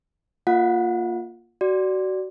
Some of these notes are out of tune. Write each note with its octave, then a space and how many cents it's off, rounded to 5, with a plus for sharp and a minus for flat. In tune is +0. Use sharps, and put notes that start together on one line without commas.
A#3 +0 F4 +0 F#5 -30
F#4 +25 D5 +0